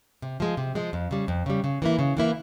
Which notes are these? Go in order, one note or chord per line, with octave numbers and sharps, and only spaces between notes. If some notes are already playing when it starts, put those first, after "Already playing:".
C3
F3 G#3
C3
F3 G#3
F2
C#3 G3
F2
C#3 G3
C#3
E3 A#3 E4
C#3
E3 A#3 E4